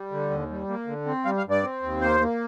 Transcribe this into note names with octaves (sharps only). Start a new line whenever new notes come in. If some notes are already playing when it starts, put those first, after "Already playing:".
Already playing: G3
D3
D#2
G3
A#3
D3
C4
G3 F5
F5
G2
D5
C4
D#2
A#3 C5
A#3